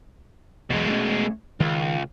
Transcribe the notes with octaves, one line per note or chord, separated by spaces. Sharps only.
B1 E2 B2 G#3
A3 A#3 C#4
C#2 D#3